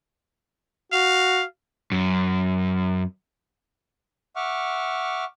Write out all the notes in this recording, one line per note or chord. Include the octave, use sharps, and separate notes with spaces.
F#4 F5
F#2
E5 F#5 C#6 D6 F6